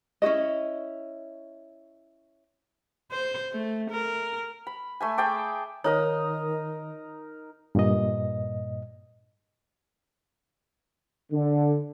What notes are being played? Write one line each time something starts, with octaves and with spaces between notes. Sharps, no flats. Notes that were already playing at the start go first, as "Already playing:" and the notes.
C#4 E4 F#4 D#5
C5
A3
A#4
B5
A3 E5 G#5
G#4 G5 A5 D6
D#3 D#4 A#4 C#5 D#6
G2 A#2 D#5
D3